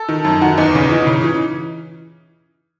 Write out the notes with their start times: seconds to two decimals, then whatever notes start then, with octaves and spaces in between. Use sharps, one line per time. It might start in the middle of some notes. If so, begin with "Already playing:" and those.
Already playing: A4
0.08 D#3
0.24 F#2
0.41 D#3 F#4
0.58 E2 D#4
0.75 C#3
0.91 E3
1.07 C#3
1.24 E3